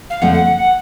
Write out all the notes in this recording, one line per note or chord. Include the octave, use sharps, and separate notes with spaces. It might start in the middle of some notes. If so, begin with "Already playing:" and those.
F5
F2 D3 F3 A3 C4 F#5
F#5
F#5
F#5